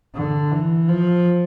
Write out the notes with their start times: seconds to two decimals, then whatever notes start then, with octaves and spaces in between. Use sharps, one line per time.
0.14 D3
0.51 E3
0.88 F3